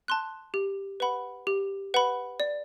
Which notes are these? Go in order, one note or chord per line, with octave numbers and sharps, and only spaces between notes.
A5 C6 F#6
G4
B4 F#5 B5
G4
B4 F#5 B5
D5